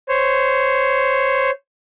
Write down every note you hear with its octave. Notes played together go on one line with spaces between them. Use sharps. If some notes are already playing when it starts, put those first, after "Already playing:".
C5 C#5